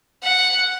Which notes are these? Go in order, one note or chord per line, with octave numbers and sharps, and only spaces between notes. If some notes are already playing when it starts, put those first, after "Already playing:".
F#5